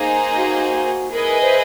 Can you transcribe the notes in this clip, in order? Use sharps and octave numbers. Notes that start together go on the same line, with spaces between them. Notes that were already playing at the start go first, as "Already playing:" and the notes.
Already playing: A#3 D#4 G#4 C5
F#4
E4 G#4 A#4 B4 D#5
C5